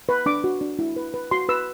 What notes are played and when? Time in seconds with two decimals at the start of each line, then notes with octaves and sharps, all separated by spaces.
0.09 B4
0.26 D4 D6
0.44 F#4
0.61 D4
0.79 E4
0.96 B4
1.14 B4
1.31 F#4 C6
1.49 B4 E6